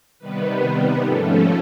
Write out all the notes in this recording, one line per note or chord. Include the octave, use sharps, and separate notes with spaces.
C3 D#3 G3 B3 B4
G#2 F3 A3 C#4 A4